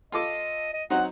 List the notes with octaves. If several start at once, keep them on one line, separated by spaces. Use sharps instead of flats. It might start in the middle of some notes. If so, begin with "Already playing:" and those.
F4 A4 D#5 D6
D#5
F#3 C4 D#4 F#5